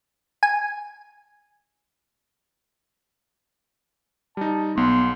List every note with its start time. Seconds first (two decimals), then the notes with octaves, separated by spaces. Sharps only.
0.43 G#5
4.37 G3 D#4 A5
4.77 B1 B3 C6